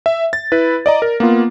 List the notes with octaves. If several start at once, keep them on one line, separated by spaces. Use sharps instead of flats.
E5
A6
E4 B4
D5 D#5 A#5
A#4
A#3 B3 F4